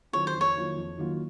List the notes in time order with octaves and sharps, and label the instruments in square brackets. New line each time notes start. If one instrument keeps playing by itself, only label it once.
[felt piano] D#3 F#3 C4 F4 [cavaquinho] C#5
[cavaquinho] C5
[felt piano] F2
[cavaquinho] C#5
[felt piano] D#3 F#3 A#3 F4
F2
D#3 F#3 A#3 F4